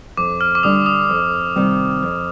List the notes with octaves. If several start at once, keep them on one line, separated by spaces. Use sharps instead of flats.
F2 D6
F6
D6
D3 G3 D4 D#6
D#6
F2
C3 D#3 G3 C4
F2